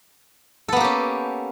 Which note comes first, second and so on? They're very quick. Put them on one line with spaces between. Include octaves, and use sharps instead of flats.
A4 B3 A#3 G4 C#4